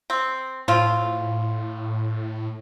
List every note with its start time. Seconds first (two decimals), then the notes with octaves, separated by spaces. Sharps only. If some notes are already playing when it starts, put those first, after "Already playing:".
0.10 C4
0.68 A2 F3 C4 F4